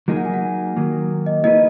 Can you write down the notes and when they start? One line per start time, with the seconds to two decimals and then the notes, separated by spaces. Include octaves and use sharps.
0.08 F#3 A#3 D#4 G#4
0.17 F#5
0.25 G#5
0.34 F#5
0.77 D#3 F#3 A#3
1.26 D#5
1.44 A#3 E4 G#4 B4 D#5